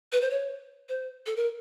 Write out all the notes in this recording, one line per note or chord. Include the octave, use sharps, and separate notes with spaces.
B4
C5
C#5
C5
A4
A#4